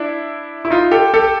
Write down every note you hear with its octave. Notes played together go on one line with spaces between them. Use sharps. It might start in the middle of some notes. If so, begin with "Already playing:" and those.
Already playing: D4 E4
E4
D#4 F4
G4 A4
G4 A4